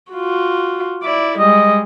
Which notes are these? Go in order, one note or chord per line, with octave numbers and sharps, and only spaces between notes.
F4 F#4
E4 D5
G3 G#3 D#5